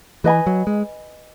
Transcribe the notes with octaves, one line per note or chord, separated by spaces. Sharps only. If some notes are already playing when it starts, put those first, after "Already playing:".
E3 B4 D#5 G#5 B5
F#3
G#3